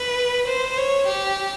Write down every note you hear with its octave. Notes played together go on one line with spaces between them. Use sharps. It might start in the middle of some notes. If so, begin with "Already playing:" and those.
Already playing: B4
C5
C#5
G4